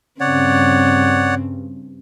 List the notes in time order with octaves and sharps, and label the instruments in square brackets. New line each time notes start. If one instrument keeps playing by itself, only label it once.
[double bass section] G2 [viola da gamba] C#3 C4 [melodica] C#5 D5 F#5